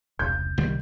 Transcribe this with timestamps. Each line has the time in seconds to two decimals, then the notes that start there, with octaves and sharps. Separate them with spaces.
0.19 E1 C2 G6
0.58 C2 D#3 G3